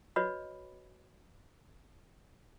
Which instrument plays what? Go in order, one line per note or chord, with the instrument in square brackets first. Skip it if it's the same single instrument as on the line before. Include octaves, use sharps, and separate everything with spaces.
[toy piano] F#4 B4 C#5 D#5 B5